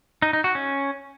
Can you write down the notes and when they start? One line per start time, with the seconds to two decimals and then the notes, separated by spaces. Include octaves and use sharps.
0.22 D#4
0.33 D#4
0.44 F#4
0.55 C#4